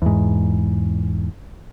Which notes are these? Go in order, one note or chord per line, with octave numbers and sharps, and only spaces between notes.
E2 G#2